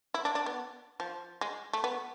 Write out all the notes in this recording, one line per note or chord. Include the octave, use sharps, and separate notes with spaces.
E4
D4
D4
B3
F3
G#3
A3
B3